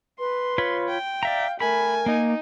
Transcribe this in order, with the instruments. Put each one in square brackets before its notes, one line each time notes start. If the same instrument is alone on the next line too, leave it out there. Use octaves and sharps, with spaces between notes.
[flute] B4 [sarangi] C6
[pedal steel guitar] F4 C#5 B5
[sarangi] G5
[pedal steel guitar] D5 E5 A#5 [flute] F5
[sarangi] A3 [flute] A#4 [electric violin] G#5 [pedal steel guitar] B5
[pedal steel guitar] A#3 [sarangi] D#4